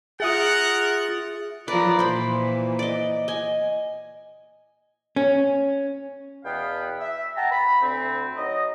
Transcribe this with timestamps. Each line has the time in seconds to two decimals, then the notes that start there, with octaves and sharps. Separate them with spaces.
0.20 F4 G#4 A#4 E5 F#5 D#6 A6
1.68 F3 A#4 B4 D5
1.99 A#2 E3 C5 B5
2.79 D5 D#5
3.28 D#5 G#5
5.16 C#4
6.44 E2 B2 B3 F5 G5
7.00 E5
7.36 F#5 G5 A5 A#5
7.51 B5
7.82 D2 C4
8.36 F#3 D#4 D#5